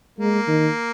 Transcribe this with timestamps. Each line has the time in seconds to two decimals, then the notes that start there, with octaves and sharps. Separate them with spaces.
0.19 G#3 A#3
0.48 D#3